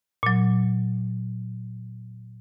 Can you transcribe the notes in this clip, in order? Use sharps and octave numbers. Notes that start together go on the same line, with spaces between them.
A#2 F#3